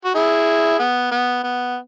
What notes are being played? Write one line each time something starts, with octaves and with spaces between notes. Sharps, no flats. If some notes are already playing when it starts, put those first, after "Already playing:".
F#4
E4 G#4
B3
B3
B3